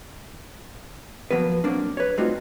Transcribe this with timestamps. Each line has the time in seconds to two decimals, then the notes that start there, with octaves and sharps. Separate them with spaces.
1.31 F3 F#3 A#3 B3 B4
1.64 F#3 G3 A#3 C4 D4
1.97 B4 C#5
2.17 G3 A3 C4 D#4 F4 F#4